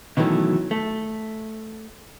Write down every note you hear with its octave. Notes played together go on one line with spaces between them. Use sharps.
B2 D#3 E3 F#3 A3 C#4
A3